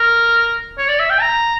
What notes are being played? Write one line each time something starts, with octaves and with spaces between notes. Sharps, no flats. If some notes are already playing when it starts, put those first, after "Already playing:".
Already playing: A#4
C#5
D5
E5
G5
A#5